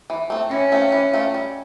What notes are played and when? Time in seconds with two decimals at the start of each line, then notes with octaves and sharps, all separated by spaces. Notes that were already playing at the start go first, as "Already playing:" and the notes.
0.10 E3
0.30 A3 C4
0.51 E3 C#4
0.72 A3 C4 F4
0.92 E3
1.13 A3 C4 F4
1.34 G3